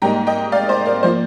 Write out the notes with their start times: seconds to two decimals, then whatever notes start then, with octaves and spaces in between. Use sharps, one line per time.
0.02 G#2 G3 A#3 D#4 G5 A#5
0.27 D#5 G5
0.52 D5 F5
0.69 C5 D#5
0.86 A#4 D5
1.03 F3 A#3 C5